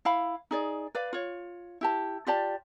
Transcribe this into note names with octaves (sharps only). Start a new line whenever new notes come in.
E4 F5 B5
D#4 G#4 D5
B4 D5 F5
F4 C#5
E4 G4 A5
F4 G4 D5 A5